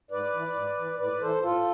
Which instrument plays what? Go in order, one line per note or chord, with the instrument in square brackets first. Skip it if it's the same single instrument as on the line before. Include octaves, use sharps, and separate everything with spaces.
[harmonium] G#2 B4 D5
E3
G#2
E3
A2 B4 D5
E3 A4 C5
A2 F4 A4